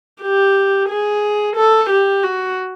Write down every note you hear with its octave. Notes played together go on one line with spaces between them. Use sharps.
G4
G#4
A4
G4
F#4